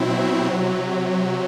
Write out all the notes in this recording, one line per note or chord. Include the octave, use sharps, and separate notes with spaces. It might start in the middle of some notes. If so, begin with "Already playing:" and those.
Already playing: B2 F#3 C4 E4
C3 F#3